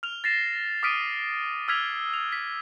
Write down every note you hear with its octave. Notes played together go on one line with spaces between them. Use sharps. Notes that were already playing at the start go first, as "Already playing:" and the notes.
F6 F7
A6 A#6 C7 E7
D6 D#6 F6 B6 D7 D#7
E6 F6 G#6 B6 F7
F7
B6